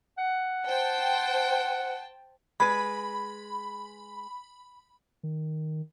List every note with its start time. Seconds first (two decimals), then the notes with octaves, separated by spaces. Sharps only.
0.18 F#5
0.65 C5 G5 A5
2.60 G#3 B4 B5
5.23 D#3